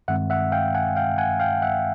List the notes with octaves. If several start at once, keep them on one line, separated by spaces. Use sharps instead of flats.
G2 D#3 G#3 C4 E5 F#5
E5 F#5
F5 G5
F#5 G#5
F5 G5
F#5 G#5
F5 G5
E5 F#5